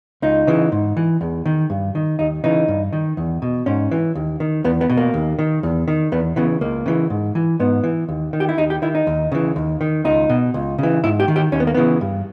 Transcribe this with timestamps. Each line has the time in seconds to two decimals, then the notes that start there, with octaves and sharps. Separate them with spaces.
0.22 C#2 D#4
0.47 C#3 E3
0.72 G#2
0.97 E3
1.21 E2
1.46 D#3
1.70 G2
1.95 D#3
2.19 D#2 D#4
2.44 C#3 E3 D#4
2.68 G2
2.93 D#3
3.17 E2
3.42 B2
3.66 G#2 C#4
3.91 E3
4.15 D#2
4.40 D#3
4.64 E2 B3
4.81 B3
4.90 B2
4.97 A#3
5.14 D#2
5.39 D#3
5.63 E2
5.88 D#3
6.12 E2 B3
6.36 C#3 E3 B3
6.61 C#2 A#3
6.86 C#3 E3
7.10 G#2
7.35 E3
7.60 G#2 B3
7.84 E3
8.09 D#2
8.33 D#3
8.40 G4
8.49 E4
8.58 D#2 D#4
8.70 G4
8.82 D#3 E4
8.95 D#4
9.07 D#2
9.32 C#3 E3
9.56 D#2
9.81 D#3
10.05 C#2 D#4
10.30 B2
10.54 C#2
10.78 C#3 E3
11.04 G#2 E4
11.20 G4
11.28 D#3
11.36 G4
11.52 D#2 C#4
11.60 B3
11.67 A#3
11.74 C#3 E3 B3
12.01 G2